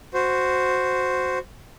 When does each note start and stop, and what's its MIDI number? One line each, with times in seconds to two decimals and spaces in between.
0.14 1.38 66
0.14 1.38 72